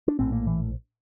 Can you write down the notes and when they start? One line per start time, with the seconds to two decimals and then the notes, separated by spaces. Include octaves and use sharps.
0.08 D4
0.19 A#1 A2 C4
0.32 A#3
0.47 E3